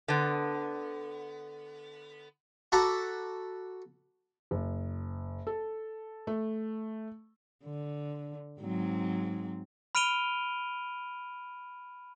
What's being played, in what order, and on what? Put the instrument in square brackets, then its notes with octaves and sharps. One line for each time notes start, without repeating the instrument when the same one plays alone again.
[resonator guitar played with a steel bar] D3 B3
[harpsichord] F#4 A4 F#5 A#5 B5 D6
[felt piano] F#1
A4
A3
[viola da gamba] D3
G#2 F#3 C4
[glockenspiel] B5 F6 D7 D#7 F7 G7